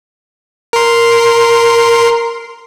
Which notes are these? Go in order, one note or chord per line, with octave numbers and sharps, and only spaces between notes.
A#4 C6